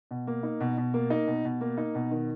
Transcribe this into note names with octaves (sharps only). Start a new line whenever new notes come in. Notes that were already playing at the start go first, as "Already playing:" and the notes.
B2
A#3
D#4
B2
B2
A#3
D#4
B2
B2
A#3
D#4
B2
D#3